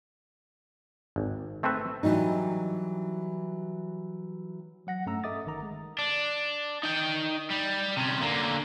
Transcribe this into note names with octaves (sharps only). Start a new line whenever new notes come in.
G#1
A3 C4 A4 B4 E5
E3 F#3 G3 D#4
F#3 F#5 A#6
G2 A3 C#4 A#5 E6
A4 D#5 E5 D6 D#6 A6
G1 D#3 A#5
G#3
D4
D#4 G5
G3
C3 C#4
D3 A#3